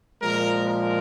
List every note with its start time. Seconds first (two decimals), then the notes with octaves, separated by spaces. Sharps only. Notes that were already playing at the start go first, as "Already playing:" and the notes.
0.21 A#2 F3 G#3 A#4
0.67 A#4